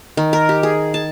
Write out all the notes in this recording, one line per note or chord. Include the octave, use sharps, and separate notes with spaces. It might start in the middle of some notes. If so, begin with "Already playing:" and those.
D#3
A#4
G4
G#4
A5